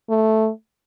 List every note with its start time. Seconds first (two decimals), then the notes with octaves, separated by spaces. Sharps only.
0.10 A3